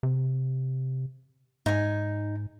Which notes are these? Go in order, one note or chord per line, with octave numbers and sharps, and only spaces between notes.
C3
G#2 D#4 G#5